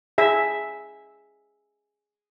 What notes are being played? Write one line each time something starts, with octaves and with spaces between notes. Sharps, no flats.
G#4 E5